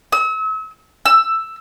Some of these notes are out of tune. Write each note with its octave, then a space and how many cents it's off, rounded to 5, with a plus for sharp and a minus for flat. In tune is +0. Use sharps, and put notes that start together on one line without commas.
E6 -40
E6 +10